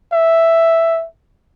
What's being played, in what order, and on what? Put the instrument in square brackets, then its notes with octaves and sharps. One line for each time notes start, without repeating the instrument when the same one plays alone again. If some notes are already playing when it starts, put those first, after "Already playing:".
[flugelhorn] E5